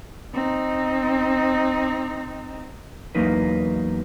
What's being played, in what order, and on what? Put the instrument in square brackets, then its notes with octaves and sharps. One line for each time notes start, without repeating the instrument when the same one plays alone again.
[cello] C4 D#4
[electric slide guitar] E2 F#3 A#3 D#4 B4